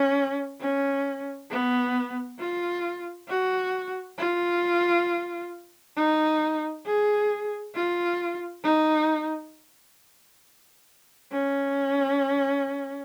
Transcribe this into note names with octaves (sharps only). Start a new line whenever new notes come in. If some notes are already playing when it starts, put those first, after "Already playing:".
Already playing: C#4
C#4
B3
F4
F#4
F4
D#4
G#4
F4
D#4
C#4